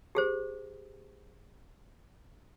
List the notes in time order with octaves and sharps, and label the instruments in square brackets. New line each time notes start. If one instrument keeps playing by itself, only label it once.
[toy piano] G4 G#4 C5